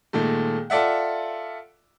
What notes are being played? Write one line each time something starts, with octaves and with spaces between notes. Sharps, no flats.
A#2 D#3 G#3 A3
F4 A4 D5 E5 F#5